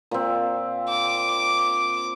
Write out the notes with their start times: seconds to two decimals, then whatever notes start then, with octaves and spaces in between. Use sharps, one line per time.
0.11 A#2 C4
0.89 D6